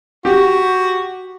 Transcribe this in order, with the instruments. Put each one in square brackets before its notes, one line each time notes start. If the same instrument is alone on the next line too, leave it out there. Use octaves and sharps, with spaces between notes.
[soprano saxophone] F#4 [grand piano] G4